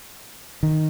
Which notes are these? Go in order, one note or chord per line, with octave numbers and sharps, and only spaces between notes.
D#3